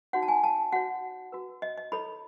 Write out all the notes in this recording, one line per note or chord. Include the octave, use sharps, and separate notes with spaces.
D#4 F#4 C#5 F#5
A5
G#5
A5
F#4 C#5 F#5
F#4 B4
D#5
D#5
E4 A4 C#5 B5